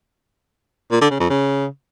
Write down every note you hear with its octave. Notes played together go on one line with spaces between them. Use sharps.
A#2
D3
C#3
F2
C#3